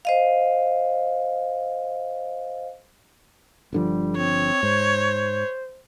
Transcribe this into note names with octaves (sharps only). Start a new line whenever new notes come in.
C5 D#5 F5
G1 D3 F3 G3
C4 C#5
G#2 C5